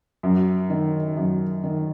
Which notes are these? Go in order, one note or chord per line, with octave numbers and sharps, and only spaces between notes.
F#2
D#3
F#2
D#3